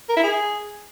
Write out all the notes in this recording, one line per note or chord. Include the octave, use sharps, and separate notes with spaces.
A#4
E4
G#4